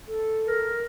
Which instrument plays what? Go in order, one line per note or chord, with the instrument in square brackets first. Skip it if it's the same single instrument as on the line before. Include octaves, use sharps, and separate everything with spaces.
[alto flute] A4
[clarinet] A#4